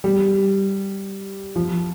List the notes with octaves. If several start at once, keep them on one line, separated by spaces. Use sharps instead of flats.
G3
F3